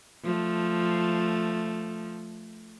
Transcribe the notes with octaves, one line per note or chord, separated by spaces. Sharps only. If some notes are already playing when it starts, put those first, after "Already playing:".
F3 A3